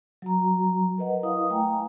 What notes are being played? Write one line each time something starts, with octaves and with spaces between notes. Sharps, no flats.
F#3 F#4 A#5
A#4 B4 D#5 F#5
E4 F5 D#6
A3 G5 G#5 A#5